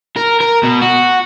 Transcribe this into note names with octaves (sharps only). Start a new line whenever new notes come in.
A#4
A#4
B2
F#4